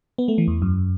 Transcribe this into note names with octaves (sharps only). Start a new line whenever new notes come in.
B3
A3
E3
E2
F#2